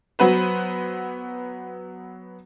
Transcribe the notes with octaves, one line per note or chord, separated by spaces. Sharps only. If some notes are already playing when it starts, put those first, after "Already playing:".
F#3 B3 B4 C5